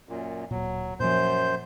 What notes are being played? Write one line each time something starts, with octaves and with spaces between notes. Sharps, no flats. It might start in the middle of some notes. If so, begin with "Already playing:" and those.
F#2 A#2
D1 A#2 F#3
F#2 A#2 F3 C5 G6